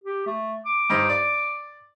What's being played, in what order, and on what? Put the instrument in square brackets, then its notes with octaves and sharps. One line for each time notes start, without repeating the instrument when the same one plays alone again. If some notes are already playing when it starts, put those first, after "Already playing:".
[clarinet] G4
A3
D6
[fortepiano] G2 D#4 C5
D5